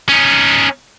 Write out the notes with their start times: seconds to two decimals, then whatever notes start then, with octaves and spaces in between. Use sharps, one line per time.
0.09 C#4 D#4